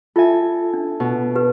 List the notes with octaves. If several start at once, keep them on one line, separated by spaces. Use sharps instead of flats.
F4 A4 E5 G#5
D4
B2
G4 B4